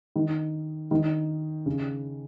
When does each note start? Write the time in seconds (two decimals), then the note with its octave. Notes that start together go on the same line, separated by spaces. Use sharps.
0.16 D#3
0.91 D#3
1.66 C#3